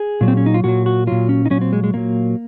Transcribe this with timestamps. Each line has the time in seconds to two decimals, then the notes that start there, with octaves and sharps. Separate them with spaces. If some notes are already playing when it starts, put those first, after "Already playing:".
Already playing: G#4
0.21 A#2 F#3
0.28 C4
0.37 C#4
0.46 D#4
0.54 F4
0.64 A#2 F#3 F#4
0.86 F#4
1.07 A#2 F#3 F4
1.29 C#4
1.46 D#4
1.50 A#2 F#3 C#4
1.61 C4
1.73 G#3
1.84 G#3
1.94 A#2 F#3 A#3